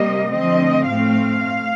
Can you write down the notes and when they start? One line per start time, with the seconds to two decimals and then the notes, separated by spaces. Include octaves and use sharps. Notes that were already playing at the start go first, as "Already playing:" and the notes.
Already playing: C3 G3 A#3 D#5
0.30 D3 F3 A3 C4 D#5
0.88 A2 A3 C4 F5